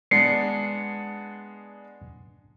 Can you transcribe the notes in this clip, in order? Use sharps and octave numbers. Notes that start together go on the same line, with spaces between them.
G#3 B3 D4 C7 C#7